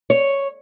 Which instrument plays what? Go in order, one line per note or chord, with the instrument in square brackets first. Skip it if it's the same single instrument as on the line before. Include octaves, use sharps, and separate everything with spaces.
[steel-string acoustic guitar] C#5